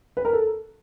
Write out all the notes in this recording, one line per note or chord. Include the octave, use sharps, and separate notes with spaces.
B4
A#4
A4